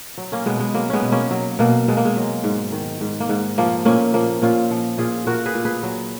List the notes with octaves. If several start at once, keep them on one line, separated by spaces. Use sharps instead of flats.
F#3
A#3 C#4
B2 G#3 B3
G#3
F#3 A#3
G#3 B3 C#4
B2
A#3 C#4
F#3
B2 A#3
B2 G#3
A#3
G#3
F#3
G#2
D#3
G#2
A#3
G#2
F3 A#3
A#2 A#3 C#4
F3 A#3
A#2 C#4 F4
F3
A#2 F4 G#4
A#2 F#4 A#4
G#4 B4
A#2
G#4 B4
F#3